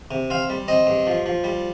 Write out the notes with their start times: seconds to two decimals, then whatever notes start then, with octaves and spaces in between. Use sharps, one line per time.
0.11 C3
0.30 C4 F5
0.50 G3
0.68 C4 D#5
0.87 G2
1.07 F3
1.26 F3
1.44 G3